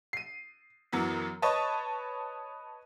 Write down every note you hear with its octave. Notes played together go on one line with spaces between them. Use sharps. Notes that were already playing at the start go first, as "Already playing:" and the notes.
C7 D#7
F#2 E3 F#3 B3
B4 C#5 D#5 A5 B5 C#6